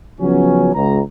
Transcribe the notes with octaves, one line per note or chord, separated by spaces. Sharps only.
C#3 F3 F#3 B3 C#4
C#2 A#5